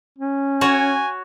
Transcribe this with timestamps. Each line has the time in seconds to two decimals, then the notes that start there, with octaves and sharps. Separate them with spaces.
0.19 C#4
0.61 F#4 C#5 G#5